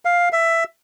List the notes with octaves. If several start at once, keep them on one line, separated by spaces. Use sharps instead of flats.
F5
E5